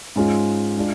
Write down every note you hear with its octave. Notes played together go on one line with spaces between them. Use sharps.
G#2 G#3 C#4 F4
G#3 D4 F4